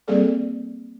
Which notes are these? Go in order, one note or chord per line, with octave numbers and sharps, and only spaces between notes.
G3 A#3 C4 G#4 A4 D5